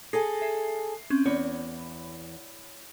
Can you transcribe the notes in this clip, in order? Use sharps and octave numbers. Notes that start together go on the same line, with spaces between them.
G#4 A4 G#5 G#6 A#6 C7
E5 C7
C4 C#4
E2 C#5 B5